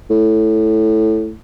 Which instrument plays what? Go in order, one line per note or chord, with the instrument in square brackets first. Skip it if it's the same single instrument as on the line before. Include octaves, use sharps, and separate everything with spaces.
[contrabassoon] A2